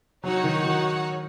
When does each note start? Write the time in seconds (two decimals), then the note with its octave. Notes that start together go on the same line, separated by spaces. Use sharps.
0.24 F#3 D#4 F#4 C#5 F#5
0.44 D#3
0.65 D#3